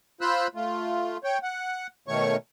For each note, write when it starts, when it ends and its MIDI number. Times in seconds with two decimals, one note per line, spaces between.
0.21 0.47 65
0.21 0.47 72
0.21 0.47 83
0.21 0.47 88
0.21 0.47 90
0.55 1.17 57
0.55 1.17 65
1.24 1.38 73
1.24 1.38 79
1.43 1.87 78
2.08 2.36 47
2.08 2.36 51
2.08 2.36 57
2.08 2.36 73
2.08 2.36 85